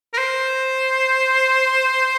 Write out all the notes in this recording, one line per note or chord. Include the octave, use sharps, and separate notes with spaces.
A#4
C5